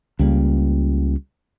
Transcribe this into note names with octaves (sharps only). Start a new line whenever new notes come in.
C#2 G3 A#3